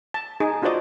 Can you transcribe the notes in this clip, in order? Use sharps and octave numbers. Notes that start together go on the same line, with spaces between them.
A5
D#4 G#4
D4 F4 F#4 C5 D5 D#5